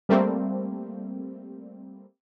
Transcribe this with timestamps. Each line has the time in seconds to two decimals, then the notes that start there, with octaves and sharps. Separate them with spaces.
0.09 G3 A3 A#3 C4